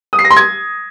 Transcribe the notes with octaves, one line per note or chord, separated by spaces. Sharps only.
D#6
C7
A#6
C6
G#6